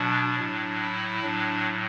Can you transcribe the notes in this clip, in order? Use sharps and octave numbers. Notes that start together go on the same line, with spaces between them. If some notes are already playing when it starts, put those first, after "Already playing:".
Already playing: B2 F#3 D4
A2 F#3
E4
A2 F#3 D4